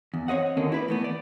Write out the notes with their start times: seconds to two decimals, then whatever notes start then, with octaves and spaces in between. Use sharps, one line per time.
0.14 E2
0.28 C4 C#5 D#5 F#5
0.57 D#2 D3 A#3 C#4 D#5
0.72 E4 B4 D5
0.88 E3 A3 B3
1.04 D5